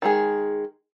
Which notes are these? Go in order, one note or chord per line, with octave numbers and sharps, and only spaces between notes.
D#3 G#3 G#4